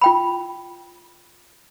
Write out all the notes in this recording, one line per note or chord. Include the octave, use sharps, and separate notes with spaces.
F4 G5 B5